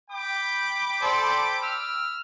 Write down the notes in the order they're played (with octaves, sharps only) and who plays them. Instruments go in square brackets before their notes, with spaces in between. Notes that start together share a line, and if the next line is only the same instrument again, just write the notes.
[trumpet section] G5 B5 D6
[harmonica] A4 C5 D5
E6 F6